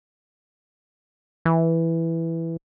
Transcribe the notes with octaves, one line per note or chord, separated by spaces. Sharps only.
E3